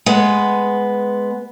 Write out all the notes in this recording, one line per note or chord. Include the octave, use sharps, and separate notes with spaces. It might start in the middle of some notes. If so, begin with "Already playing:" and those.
G#3 B3 B4